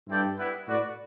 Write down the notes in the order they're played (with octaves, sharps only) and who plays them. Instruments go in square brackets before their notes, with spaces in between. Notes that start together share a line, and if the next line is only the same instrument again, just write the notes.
[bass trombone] G2 [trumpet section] C4 E4 A4 D5 G5
[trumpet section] G3 B3 E4 B4
[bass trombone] A2 [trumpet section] F#4 B4 D5